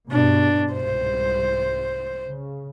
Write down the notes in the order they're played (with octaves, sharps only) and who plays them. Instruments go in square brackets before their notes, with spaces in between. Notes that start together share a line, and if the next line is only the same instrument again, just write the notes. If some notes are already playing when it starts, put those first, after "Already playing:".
[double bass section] G2 B2 [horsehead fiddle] D4
[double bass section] C2 G#2 [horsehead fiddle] C5
[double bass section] C#3